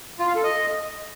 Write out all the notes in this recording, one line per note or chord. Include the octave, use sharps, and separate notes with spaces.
F4
F5
A4
D#5